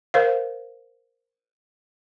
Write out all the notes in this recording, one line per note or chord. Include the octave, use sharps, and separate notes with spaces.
A#4 C5 F5